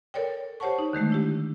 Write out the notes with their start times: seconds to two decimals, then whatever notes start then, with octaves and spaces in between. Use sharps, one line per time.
0.14 A4 A#4 C#5 D5 G5
0.60 G4 C5 C#5 F#5 A5 C#6
0.79 D#4
0.93 D3 D#3 G#3 A3
1.10 D4 E4 G4